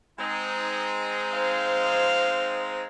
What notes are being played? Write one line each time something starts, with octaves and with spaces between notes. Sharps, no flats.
G#3 C4 D#4
C5 F5